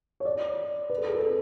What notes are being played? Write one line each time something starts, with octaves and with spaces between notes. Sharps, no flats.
C#5
D5
B4
A4
G#4
A4